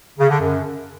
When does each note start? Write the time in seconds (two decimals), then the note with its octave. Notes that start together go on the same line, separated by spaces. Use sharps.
0.19 C#3
0.29 D3
0.40 F#2